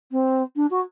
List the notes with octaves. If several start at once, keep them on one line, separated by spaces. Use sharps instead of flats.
C4
D4
F#4